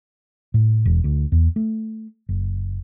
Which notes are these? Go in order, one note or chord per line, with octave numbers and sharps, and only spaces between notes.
A2
E1
D2
E2
A3
F#1